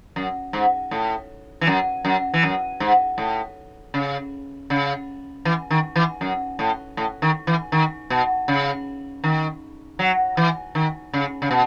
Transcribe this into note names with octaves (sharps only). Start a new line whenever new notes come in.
F#2
G#2
A2
E3
F#2
F#2
E3
F#2
G#2
A2
C#3
C#3
E3
D#3
E3
F#2
A2
A2
D#3
E3
D#3
B2
C#3
D#3
F#3
E3
D#3
C#3
C#3
B2